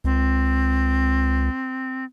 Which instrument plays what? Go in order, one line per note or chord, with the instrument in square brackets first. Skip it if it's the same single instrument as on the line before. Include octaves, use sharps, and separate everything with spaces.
[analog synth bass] C#2 [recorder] C4